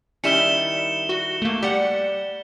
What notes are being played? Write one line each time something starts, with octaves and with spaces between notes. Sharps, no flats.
D#3 G3 C#4 E4 C#7 E7 G7
F#4
A3 A#3
G3 G4 F#5